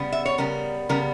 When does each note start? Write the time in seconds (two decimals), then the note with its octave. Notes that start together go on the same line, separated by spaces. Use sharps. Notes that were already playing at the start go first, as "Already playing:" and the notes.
Already playing: C#3 G3 B3
0.12 E5
0.25 C#5
0.38 C#3 G3 B3 A#4
0.89 C#3 G3 B3 A#4